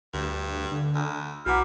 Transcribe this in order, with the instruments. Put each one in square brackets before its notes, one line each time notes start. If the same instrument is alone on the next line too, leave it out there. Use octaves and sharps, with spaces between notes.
[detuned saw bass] D2 [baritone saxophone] G2
[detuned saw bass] D3
[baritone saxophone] D2
[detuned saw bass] B1 [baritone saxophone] E3 [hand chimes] F#4 D6 [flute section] F#5 A#5 F6